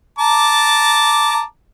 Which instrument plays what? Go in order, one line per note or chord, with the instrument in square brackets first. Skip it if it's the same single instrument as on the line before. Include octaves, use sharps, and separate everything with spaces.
[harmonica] A5 A#5 D6